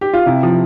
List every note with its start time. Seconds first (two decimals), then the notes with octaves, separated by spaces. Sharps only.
0.01 G4
0.13 F4
0.26 C3 E4
0.43 F3